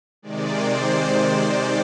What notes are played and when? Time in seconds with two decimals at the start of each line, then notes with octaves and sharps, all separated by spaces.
0.22 C3 D#3 G#3 D5
0.53 C5